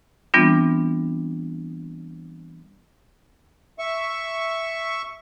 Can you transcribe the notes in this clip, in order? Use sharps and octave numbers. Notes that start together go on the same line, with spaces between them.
E3 G3 B3 C4 D4 F4
E5 C#6